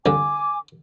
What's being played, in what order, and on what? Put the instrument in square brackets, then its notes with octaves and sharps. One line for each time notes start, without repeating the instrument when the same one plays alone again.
[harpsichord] C2 D3 [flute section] G#5 D6